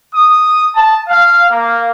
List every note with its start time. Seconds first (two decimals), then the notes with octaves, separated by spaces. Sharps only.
0.14 D#6
0.75 A5
1.08 F5
1.49 A#3